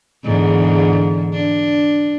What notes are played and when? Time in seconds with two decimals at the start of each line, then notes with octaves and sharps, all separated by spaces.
0.25 E2 G#2 D3
1.33 D4